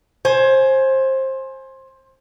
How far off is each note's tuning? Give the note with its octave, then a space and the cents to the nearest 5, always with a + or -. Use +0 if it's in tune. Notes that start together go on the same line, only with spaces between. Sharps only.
C5 +20 G#5 +15